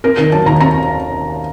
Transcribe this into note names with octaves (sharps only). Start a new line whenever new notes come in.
C4 A#4
D#3 A#4
F#3 A5
D#2 A#5
C4 A#5